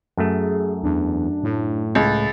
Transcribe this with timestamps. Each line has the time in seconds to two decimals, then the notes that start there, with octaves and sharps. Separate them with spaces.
0.17 F#2 A3 G#4
0.83 E2 D4
1.43 A2
1.95 C#2 A6